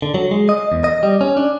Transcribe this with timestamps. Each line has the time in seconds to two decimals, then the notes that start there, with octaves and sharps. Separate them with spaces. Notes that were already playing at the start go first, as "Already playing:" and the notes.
0.02 D3
0.14 F#3
0.31 G#3
0.49 D#5
0.72 E2
0.84 D#5
1.03 G3
1.21 C#4
1.37 D4